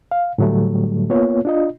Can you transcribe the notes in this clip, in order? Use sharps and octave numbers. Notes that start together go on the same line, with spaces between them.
F5
A2 D3 F#3 G3 A3
A#3 B3 F4 C#5
D4 F4 D#5